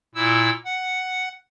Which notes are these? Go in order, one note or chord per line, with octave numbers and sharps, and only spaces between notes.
A#2 E4 E6
F#5